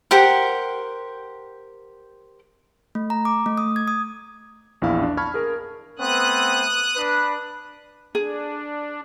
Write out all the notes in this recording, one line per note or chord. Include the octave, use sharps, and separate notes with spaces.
G4 A#4 C5 F#5
A3
A#5
D6
A3
D#6
G#6
D#6
A#1 E2 E4 F5
D4
A5 B5 C#6 F6 G#6
G#4 A#4
A3 B3 C4 D#6 F#6
D4 B4
D4 G#4